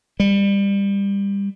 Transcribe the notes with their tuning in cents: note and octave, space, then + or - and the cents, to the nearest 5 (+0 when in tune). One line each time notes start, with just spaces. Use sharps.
G3 +25